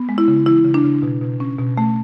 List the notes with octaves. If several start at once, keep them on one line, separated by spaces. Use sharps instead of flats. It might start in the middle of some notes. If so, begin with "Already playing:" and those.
Already playing: B3
G#3
E4
C#3
E3 E4
C#3
D4
C#3
B2
B2
C#4
B2
A3